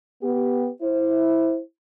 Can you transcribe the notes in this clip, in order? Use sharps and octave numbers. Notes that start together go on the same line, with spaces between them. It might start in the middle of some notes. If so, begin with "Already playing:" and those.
B3 G4
E4 C5